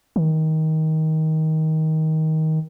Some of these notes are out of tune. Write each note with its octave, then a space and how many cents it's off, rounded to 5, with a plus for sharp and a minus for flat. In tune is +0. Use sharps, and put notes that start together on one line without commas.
D#3 +20